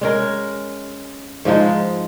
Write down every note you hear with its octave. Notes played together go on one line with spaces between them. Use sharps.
G#3 C#4 A#4
G#2 F3 G#3 D#4